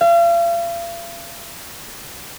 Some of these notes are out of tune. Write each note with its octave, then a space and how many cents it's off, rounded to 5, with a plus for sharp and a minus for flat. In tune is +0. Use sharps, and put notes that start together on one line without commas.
F5 -40